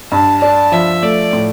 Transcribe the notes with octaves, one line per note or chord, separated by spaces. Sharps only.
G2 A5
D4 A5
F3 E5
A3 D5
A2